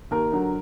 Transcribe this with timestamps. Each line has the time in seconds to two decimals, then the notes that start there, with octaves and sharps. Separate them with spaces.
0.11 D#2 A#4
0.32 D3 F#3